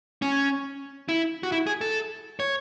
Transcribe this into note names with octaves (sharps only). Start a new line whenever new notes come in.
C#4
E4
F#4
E4
G#4
A4
C#5